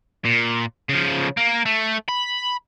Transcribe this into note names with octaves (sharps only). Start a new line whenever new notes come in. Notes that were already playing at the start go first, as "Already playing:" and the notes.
A#2
C#3 F3
A#3
A3
B5